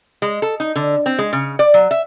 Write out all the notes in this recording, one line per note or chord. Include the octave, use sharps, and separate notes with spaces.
G#3
A4
D#4
D3
C4
G#3
C#3
D5
F#3
E5